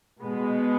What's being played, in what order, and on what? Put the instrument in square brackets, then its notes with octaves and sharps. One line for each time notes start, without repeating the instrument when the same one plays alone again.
[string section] B2 G#3 B3